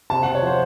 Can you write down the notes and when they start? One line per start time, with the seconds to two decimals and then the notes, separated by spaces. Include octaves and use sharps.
0.10 C3 A5
0.23 C3 F#5
0.35 C#5
0.42 F3 C5